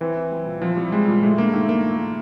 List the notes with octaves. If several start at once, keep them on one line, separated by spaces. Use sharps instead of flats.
E3 C4
E4
G3
A#2
F3 C4
G3 E4
G3 G#3
A#2
G#3 A3
G2 A#3
D#3 A3
A#3